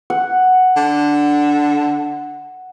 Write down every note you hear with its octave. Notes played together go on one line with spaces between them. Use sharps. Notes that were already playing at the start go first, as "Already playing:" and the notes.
F#5
D3